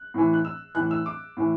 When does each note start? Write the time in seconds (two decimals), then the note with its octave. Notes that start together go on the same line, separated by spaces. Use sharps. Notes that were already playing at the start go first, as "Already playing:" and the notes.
Already playing: F#6
0.14 A2 E3
0.33 F#6
0.45 E6
0.75 A2 E3 F#6
0.91 E6
1.06 D6
1.37 A2 E3